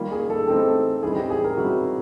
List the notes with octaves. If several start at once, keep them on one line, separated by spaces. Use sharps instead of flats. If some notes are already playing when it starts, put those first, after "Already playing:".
Already playing: D#3 G3 A#3 F4
G#4
A4
E3 A3 C4 D#4 G4 A4
E3 G3 C4 D#4 G#4
G4
G#4
A#4
C3 D#3 G3 C4 E4 F#4